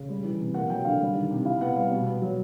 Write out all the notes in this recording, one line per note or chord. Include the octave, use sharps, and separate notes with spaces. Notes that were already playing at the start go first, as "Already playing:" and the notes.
Already playing: C#3
G3
E3
C3
A#3 F#5
F#3 G5
D3 F5
G3
D#3
C3
E4 F5
B3 F#5
G3 F5
B2
B3
F#3